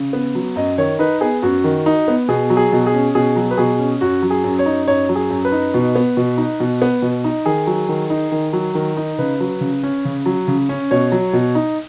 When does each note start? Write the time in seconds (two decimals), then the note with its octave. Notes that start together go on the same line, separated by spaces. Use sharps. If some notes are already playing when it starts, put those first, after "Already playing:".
Already playing: C#3
0.13 B3
0.35 F#3
0.56 F#2 D#5
0.78 D#3 C#5
0.99 D#4 B4
1.21 B3 G#4
1.42 F#2 F#4
1.64 D#3
1.86 D#4
2.08 B3
2.28 B2 G#4
2.50 F#3
2.57 G#4
2.72 B2
2.86 G#4
2.94 C#4
3.15 B2 G#4
3.36 F#3
3.51 B4
3.57 B2 G#4
3.79 C#4
4.01 F#2 F#4
4.22 F#3
4.30 G#4
4.44 F#2
4.59 C#5
4.66 D#4
4.87 F#2 C#5
5.09 F#3
5.15 G#4
5.30 F#2
5.45 B4
5.52 D#4
5.74 B2
5.95 B3
6.17 B2
6.38 D#4
6.60 B2
6.82 B3
7.02 B2
7.24 D#4
7.46 D#3 G#4
7.67 F#3
7.89 D#3
8.10 D#4
8.32 D#3
8.53 F#3
8.75 D#3
8.97 D#4
9.19 C#3 B4
9.40 F#3
9.61 C#3
9.83 C#4
10.05 C#3
10.26 F#3
10.48 C#3
10.69 C#4
10.91 B2 C#5
11.12 F#3
11.33 B2
11.55 D#4